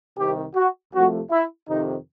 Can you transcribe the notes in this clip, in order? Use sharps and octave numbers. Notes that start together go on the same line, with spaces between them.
C2 C3 D#3 G4
F#4
C2 C3 F3 A3 F#4
E4
F2 C3 D#3 D#4